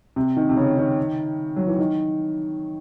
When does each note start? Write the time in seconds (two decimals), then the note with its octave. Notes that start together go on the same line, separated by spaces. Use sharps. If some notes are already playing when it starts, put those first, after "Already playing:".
0.16 C3
0.37 D#3
0.49 C3
0.57 C#3
0.77 D#3
1.56 F#3
1.68 E3
1.79 D#3